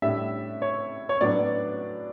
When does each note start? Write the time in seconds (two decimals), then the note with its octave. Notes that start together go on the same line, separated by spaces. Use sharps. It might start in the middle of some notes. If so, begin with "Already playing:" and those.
0.02 A2 G3 D4 E5
0.62 C#5
1.09 C#5
1.21 A2 F#3 B3 D4 D5